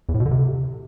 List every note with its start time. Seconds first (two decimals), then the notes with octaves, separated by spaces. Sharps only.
0.09 E2
0.14 A2
0.20 B2
0.26 D3
0.31 C3